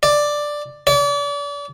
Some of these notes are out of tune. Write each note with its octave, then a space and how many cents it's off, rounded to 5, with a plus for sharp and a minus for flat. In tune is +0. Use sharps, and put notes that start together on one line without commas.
D5 +5
D5 -40